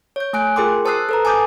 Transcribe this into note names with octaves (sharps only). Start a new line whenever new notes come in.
C#5 G6
A3 G#5 F#6 D7
F4 G#4 A#4 G5 C6 D6
C5 A5 D#6 E6 F#6 C7
A4 B4 A#5
G#5 A5 D6 D#6 G6